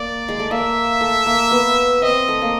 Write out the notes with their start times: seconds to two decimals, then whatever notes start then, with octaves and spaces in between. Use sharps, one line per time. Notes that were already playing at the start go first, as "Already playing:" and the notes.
Already playing: A#3 D5
0.28 G#3
0.40 A3
0.51 A#3 E5
1.01 A3
1.26 A#3
1.51 B3
2.02 C4 D#5
2.28 A3
2.42 A#3